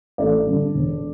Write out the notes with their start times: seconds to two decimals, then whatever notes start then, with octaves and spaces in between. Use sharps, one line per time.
0.18 A1 A4 D5
0.46 G2 D3
0.74 E1